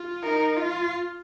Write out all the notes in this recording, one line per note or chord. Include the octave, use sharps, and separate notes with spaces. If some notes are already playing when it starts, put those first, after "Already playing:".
Already playing: F4
D#4 A#4
F4